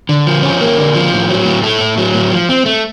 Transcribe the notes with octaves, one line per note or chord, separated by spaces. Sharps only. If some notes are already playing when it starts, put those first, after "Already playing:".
D3
F3
C#4
A#3
D3
F3
A2
F#3
A2
A3
A2
F#3
A2
F3
C4
A3